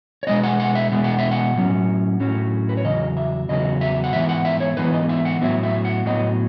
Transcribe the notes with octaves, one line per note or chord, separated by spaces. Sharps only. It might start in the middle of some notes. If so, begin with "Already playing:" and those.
C#5
B2 G#3 B3 D#5
F#5
F#5
E5
B2 G#3 B3
F#5
E5
F#5
A2 F#3 C#4
A2 F#3 C#4
B4
C#5
E2 C#3 F#3 D#5
E5
E2 C#3 F#3 B3 D#5
E5
F#5
G#2 E3 B3 E5
F#5
E5
C#5
G#2 E3 B3 B4
D#5
E5
F#5
A2 F#3 B3 E5
E5
F#5
A2 F#3 B3 D#5